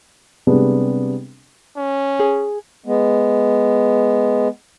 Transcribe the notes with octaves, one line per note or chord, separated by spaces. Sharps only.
C3 G3 G#3 B3 D4
C#4
G#4
G#3 B3